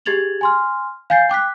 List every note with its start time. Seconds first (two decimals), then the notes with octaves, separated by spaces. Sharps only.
0.06 G4 G#4 G#6 A6 F7 F#7
0.41 G#5 C6 F6
1.10 F5 G#5 G6 A6 C7
1.29 G5 D6 F#6 B6